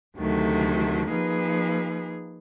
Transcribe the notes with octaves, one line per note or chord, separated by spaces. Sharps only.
D2 C3 D#3 F#3 A3
F3 A#3 D#4 G#4 B4